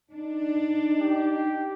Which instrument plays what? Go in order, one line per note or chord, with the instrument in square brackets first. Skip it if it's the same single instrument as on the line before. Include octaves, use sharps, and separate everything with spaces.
[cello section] D4 [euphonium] D#4
[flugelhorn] G4